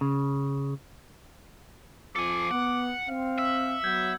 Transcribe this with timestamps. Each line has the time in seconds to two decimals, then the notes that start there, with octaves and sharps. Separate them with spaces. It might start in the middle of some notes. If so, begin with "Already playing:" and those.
0.01 C#3
2.16 F2 F3 A4 G#5 D6 C#7
2.51 B3 F#5
3.09 C4 F5
3.38 E5 E6
3.84 F#3 B3 G6 G#6